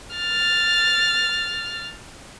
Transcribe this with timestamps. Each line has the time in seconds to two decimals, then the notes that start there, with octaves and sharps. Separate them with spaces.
0.16 F6 A6